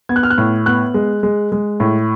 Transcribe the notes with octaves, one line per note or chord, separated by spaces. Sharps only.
B3 G#6
F#6
F6
F#6
A2
B3 F#6
G#3
G#3
G#3
A2